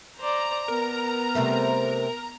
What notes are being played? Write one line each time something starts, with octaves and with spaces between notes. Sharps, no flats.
C5 D5 A#5
B3 A#4
C3 G3 A3